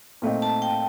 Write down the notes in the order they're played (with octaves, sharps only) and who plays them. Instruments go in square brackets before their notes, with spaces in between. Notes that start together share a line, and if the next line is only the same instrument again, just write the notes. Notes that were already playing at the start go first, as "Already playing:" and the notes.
[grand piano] A#2 A3 C4 D#4
[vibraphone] A5
G5